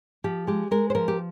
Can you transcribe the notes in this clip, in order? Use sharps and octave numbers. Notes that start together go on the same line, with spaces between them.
F3 G4
G#3 G4
G#3 A#4
C5
F3 A#4
G4